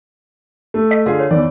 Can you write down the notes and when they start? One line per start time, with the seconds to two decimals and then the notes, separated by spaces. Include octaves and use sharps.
0.74 A3
0.91 D#5 B6
1.06 D3 F4 G#4 F5
1.19 C#5
1.31 E2 D#3 D5